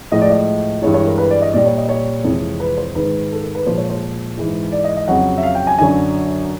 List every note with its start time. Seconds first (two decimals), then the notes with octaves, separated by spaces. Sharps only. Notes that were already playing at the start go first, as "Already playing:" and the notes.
0.12 A2 F3 G#3 D#5
0.21 D5
0.31 D#5
0.82 G2 E3 G#3 C#5
0.94 C#5
1.07 A#4
1.18 B4
1.30 D5
1.42 D#5
1.53 A#2 G3 D5
1.66 C#5
1.78 D#5
1.89 C#5
2.24 F2 C3 E3 G#3
2.60 B4
2.78 C5
2.95 G#2 D#3 G#3 B4
3.32 A4
3.43 A#4
3.55 B4
3.66 A#2 F3 G#3 C5
3.78 C#5
3.90 C5
4.37 G#2 E3 G#3
4.72 D5
4.84 D#5
4.97 D#5
5.08 F2 C#3 F#3 F#5
5.37 E5
5.43 F5
5.55 G5
5.67 G#5
5.78 F#2 D3 F#3 G#5